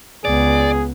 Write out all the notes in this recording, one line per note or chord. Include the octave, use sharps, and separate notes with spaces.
C#2 B3 G#4 D5